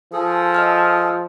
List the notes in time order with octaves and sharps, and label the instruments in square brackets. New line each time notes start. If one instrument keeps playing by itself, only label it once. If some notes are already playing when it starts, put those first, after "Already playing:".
[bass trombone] F3 [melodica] G#4 A4
[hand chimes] D#5 E6 F6